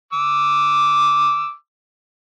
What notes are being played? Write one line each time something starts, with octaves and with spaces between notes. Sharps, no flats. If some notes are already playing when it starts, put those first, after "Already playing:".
D6 E6